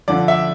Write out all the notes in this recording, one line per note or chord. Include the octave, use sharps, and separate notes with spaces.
F2 D3 F3 D5
E5